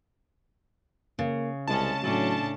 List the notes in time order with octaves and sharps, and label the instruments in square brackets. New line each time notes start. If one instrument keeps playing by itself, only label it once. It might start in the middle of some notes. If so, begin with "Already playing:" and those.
[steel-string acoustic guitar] C#3 [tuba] A#3
[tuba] C2 [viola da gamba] G#3 C#4 [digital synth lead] A5
[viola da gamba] A2 C#4 D4 [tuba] F#3